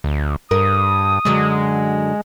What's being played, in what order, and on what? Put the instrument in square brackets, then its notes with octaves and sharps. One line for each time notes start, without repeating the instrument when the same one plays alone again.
[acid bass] D2
[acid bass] G2 [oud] A#4 [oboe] D#6
[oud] F#2 D3 F#3 [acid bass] G#3